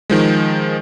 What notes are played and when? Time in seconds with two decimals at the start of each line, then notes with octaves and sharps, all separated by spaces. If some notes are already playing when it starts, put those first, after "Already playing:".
0.10 D#3 F3 G#3